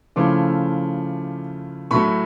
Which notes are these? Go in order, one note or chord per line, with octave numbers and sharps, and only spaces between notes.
C#3 F3 A3 C#4 E4 C6 D6
A2 F#3 A3 B5 C#6